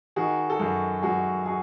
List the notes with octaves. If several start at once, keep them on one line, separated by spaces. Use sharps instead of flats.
D#3 F#4 G#4
A4
F#2 F#4 G#4
F#2 F#4 G#4
F#4 G#4